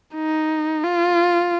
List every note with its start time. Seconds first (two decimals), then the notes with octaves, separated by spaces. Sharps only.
0.15 D#4
0.84 F4